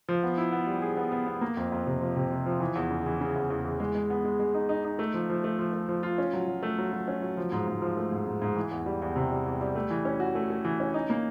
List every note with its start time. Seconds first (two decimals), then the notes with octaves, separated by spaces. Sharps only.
0.09 F3
0.23 B3
0.38 E4
0.52 B3
0.67 G3
0.82 G#4
0.97 B3
1.12 B3
1.27 B3
1.41 A#3
1.57 F2
1.72 F2
1.87 C3
2.01 F3
2.16 C3
2.32 C3
2.46 F3
2.60 E3
2.75 E2
2.91 C#3
3.06 E3
3.21 C#3
3.35 E2
3.50 E2
3.65 E3
3.80 G#3
3.95 G#3
4.10 B3
4.25 G#3
4.39 G#3
4.54 D#4
4.69 D#4
4.84 D#4
4.99 A3
5.14 F3
5.30 F3
5.44 A3
5.59 F3
5.74 A3
5.89 F3
6.03 F4
6.18 C#4
6.33 F#3
6.48 F#3
6.63 A3
6.78 F#3
6.93 F#3
7.08 C#4
7.22 F#3
7.37 F3
7.52 G#2
7.68 G#2
7.82 F3
7.97 A3
8.12 G#2
8.27 G#2
8.42 G#2
8.56 E3
8.71 E2
8.86 G3
9.02 E2
9.16 C3
9.31 G3
9.46 E2
9.61 G3
9.75 A3
9.91 E3
10.05 C#4
10.20 F#4
10.35 A3
10.50 A3
10.65 E3
10.80 C#4
10.94 D#4
11.10 A#3